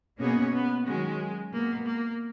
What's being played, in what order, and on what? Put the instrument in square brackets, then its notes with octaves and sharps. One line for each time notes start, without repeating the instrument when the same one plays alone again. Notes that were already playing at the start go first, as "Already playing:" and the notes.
[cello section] B2 A#3 C#4 G#4 C#5 [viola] B3
[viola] B3
[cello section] D#3 F#3 C#4 F#4 [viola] G#3
[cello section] B2 G#3 B3 [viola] A#3
[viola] A#3